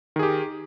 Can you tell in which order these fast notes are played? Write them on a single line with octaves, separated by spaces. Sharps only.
D#3 G#4 G4